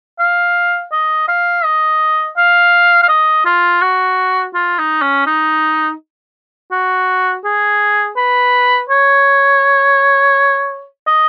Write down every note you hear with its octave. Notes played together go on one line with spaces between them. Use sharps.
F5
D#5
F5
D#5
F5
F5
D#5
F4
F#4
F4
D#4
C#4
D#4
F#4
G#4
B4
C#5
D#5